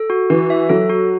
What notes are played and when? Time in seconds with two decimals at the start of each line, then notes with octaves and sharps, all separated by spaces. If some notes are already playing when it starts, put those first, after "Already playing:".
Already playing: A4
0.10 F#4
0.30 E3 F#4
0.50 E5
0.69 F#3 A4
0.89 F#4